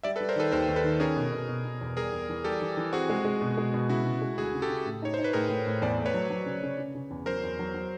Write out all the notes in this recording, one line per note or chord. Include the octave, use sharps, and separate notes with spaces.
G3 D5 E5
A4 B4
G3
A#4 C5
D#3 A4 B4
D#2 A#4 C5
D#2
A4 B4
D#3
C#4 G#4 A#4
B2
B2
B2
B2
E2
G3 G#4 A#4
E2
E3
G3 G4 A4
E3
E3
C4 F#4 G#4
G#3
G#3
B2
G#3
B2
C#3 E4 F#4
C#3
G#3
D2 F#4 G#4
C#3
G4 A4
C#3
A2
D#4 C#5
D#4 C5
B4
A2 G#4 A#4
A2
A2
E2 C5 D5
A3
B4 C#5
F#3
F#3
C#3
C#3
C#3
C#3
E2
F#3 A#4 C5
E2
F#3
F#3